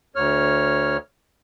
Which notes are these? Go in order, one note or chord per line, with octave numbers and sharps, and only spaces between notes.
D2 C#5 F6